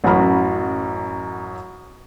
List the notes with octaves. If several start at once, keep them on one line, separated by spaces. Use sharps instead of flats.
A1 F#2 F#3 F#4 B5 F6